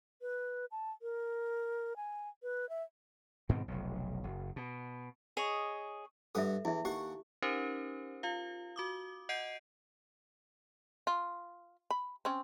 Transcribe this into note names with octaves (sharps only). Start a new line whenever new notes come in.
B4
A5
A#4
G#5
B4
E5
G#2 B2 D#3 C4
F1 B1
F#1
B2
G#4 C#5 D#5
G2 A4 E5 F#5 D#6
E2 E4 E5
D#2 G4 F#5 C#6
C#4 D#4 G4 A#4 C5
F4 F5
F#4 D6 D#6
D#5 F#5 G6 C7 D7 D#7
F4
B5
C4 C#4